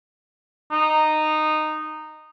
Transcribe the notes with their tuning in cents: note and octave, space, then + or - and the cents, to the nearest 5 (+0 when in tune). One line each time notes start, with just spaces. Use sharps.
D#4 -10